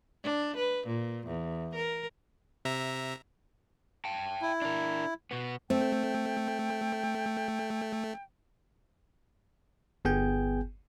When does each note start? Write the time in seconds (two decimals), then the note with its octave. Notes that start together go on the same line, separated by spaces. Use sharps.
0.24 D4
0.57 B4
0.87 A#2
1.27 E2
1.75 A#4
2.65 C3 E5 A#5
4.05 G5 A5
4.42 E4
4.62 D4 A#4
5.31 B2 B3
5.70 A3 C4 G5
10.05 G1 B3 G#4 G5 G#5 G6